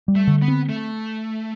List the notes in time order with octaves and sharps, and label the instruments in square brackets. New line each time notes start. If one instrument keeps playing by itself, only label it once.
[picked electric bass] G3
[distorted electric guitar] A3
[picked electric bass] D3
[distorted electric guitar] B3
[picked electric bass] C4
[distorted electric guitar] A3